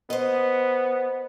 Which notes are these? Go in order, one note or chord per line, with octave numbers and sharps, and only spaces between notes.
B3 C5 D#5